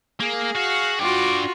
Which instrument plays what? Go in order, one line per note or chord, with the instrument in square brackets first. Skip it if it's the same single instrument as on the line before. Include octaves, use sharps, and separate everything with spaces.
[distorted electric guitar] A#3 [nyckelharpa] G#4
[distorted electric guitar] F#4 [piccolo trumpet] F5
[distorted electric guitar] D4 G5 [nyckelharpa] F4 F#4 [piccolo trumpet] D6